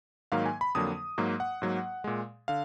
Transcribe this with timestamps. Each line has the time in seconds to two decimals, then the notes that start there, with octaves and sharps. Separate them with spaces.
0.32 G#2 D#3 F#3 A#3 F5
0.46 G#5
0.61 B5
0.75 F2 D3 F#3 A#3 D#6
1.18 G#2 F#3 A#3
1.40 F#5
1.62 G#2 F#3 A#3
2.04 A#2 G#3
2.48 D3 F5